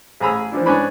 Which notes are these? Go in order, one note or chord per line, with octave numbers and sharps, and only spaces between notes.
A1 G#4 A#5 B5 E6
E3 F3 D4 E4
G#2 C#4 D4 B4 B5